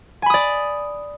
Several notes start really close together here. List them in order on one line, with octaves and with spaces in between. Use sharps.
G#5 B5 D#6 D5